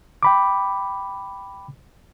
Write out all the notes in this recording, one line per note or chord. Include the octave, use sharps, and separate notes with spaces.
G5 B5 D6